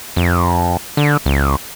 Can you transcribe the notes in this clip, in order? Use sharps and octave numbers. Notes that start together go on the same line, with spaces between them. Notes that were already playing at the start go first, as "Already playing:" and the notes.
F2
D3
C#2